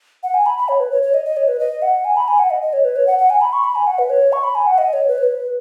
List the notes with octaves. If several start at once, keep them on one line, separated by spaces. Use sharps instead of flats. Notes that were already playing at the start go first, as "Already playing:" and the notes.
F#5
G#5
B5
B5
C#5
B4
C#5
C#5
D#5
D#5
C#5
B4
D#5
F#5
G#5
B5
G#5
F#5
D#5
D#5
C#5
B4
C#5
F#5
F#5
G#5
B5
C#6
B5
G#5
F#5
B4
C#5
C#6
B5
G#5
F#5
D#5
C#5
B4
C#5
B4